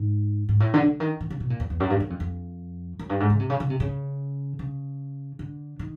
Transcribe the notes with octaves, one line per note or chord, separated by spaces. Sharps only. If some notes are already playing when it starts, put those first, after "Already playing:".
Already playing: G#2
G#2
A2
D3
D3
D#3
D#3
C#3
B2
A#2
E2
E2
F#2
G2
F#2
F2
F2
F#2
G2
G#2
C#3
C3
C#3
C#3
C3
C#3
C#3
D3
D#3